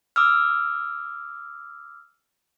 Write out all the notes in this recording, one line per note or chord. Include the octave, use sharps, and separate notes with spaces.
D6 E6 F6